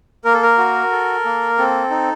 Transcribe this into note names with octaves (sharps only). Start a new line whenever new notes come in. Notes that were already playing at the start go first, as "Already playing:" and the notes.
A#3 A#4
A4
A#4
F#4
A4
A#3
C4 A4
D#4